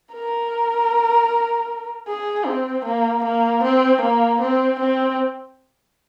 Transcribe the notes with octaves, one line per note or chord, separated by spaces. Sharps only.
A#4
G#4
C4
A#3
A#3
C4
A#3
C4
C4